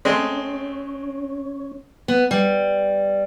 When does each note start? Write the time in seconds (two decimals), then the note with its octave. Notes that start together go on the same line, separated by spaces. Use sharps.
0.05 G#3 A3 C4 C#4
2.08 B3
2.31 G3